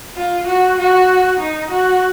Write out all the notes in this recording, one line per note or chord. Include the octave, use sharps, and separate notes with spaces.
F4
F#4
F#4
D#4
F#4